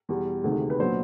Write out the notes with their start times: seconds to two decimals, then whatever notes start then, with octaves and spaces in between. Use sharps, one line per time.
0.09 E2 B2 G3
0.44 D2 C3 D#3 G#3
0.70 B4
0.79 A#2 F#3 B3 D4 C5